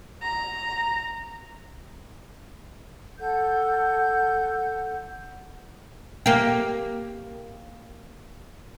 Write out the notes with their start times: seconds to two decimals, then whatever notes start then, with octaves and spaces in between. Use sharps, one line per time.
0.22 A#5
3.19 A4 F#5 G6
6.26 A#3 G4